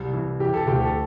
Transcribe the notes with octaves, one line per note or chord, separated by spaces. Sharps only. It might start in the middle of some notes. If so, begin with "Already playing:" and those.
Already playing: C2 C3
E3
E3 G4
A4
D2 G4
A4